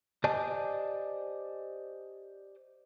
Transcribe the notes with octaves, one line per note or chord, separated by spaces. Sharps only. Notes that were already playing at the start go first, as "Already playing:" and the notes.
G4 C5 D5 D#5 G#5 A5